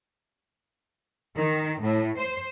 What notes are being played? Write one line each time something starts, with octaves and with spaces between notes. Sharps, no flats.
D#3
A2
C5